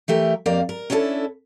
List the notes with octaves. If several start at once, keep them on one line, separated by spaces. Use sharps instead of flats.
E3 A3 G4 A#4
F2 A#3 G4 A#4 D5 F5
A#4
C#4 D4 E4 G4 A4